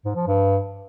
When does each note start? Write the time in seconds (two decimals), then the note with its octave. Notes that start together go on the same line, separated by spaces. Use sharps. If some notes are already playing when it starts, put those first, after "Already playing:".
0.05 G#2
0.16 F3
0.27 G2